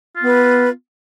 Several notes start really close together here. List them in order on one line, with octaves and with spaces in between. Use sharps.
F4 B3 B4